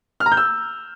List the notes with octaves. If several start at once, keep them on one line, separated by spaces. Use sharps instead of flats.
F6
A#5
G6
E6